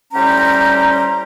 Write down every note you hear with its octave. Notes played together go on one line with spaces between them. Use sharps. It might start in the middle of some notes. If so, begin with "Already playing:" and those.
A2 G3 C#4 G4 C5 A#5